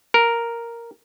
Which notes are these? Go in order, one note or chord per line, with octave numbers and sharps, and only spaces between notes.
A#4